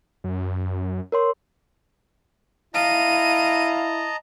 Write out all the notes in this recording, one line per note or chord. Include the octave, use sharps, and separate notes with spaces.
F#2
A#4 C#5 C6
E4 D#5 F5 A5 A#5 D#7